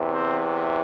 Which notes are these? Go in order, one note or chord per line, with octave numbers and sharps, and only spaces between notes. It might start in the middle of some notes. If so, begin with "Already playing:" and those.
Already playing: E2 C3 E3
C4